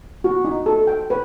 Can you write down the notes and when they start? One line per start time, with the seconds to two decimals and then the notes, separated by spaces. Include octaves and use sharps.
0.24 F#4
0.45 D#4
0.66 A4
0.87 G5
1.10 B4